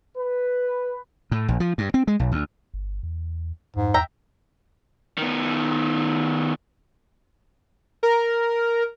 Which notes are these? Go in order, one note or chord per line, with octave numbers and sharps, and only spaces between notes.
B4
A2
A#1
F3
G2
C4
G#3
B1
D2
G1
E2
F2 G#2
E2 E5 G5 A#5
D#3 B3
A#4